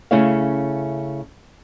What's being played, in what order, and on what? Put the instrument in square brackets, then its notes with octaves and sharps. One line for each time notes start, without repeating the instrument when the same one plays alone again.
[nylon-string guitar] C#3 A3 C#4 E4 C#5 F5